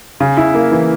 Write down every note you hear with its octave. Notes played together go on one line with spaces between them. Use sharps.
C#3
E4
A#3
E3